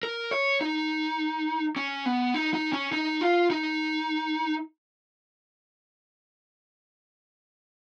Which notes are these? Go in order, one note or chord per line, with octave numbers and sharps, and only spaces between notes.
A#4
C#5
D#4
C#4
B3
D#4
D#4
C#4
D#4
F4
D#4